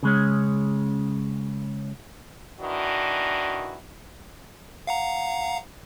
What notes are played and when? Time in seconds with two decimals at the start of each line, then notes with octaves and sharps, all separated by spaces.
0.03 C#3 G#3 C#4
2.61 D#3 E3 D4 F#4
4.87 F5 F#5 A#5